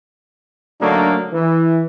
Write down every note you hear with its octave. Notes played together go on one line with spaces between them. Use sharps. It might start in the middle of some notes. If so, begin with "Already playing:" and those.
D3 F#3 A3 A#3 D4 D#4
E3